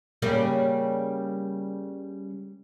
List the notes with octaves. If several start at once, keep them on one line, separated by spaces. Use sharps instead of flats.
C#3 G3 A#3